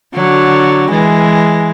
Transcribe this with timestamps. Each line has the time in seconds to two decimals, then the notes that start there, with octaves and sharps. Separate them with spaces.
0.15 D3 F#3
0.91 E3 G#3